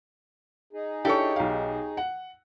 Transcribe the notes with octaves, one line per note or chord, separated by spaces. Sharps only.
D#4 G#4
D4 E4 G4 A4 C#5
B1 F5
F#5